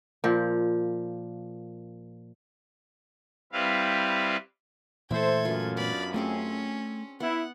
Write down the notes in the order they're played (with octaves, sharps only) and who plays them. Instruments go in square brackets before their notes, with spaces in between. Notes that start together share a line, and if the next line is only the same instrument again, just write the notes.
[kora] A#2 F3
[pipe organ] G3 C4 E4 B4 F5
[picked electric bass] A#2 E3 A3 [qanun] E4 E5 [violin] A4 G#6 [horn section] C5
[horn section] F#2 [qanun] F4 B4
[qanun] B3 D4 [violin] D5 B5
[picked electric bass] A3 [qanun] C4 G#4 D6 [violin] C#4
[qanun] B3 [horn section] E4 [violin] F#5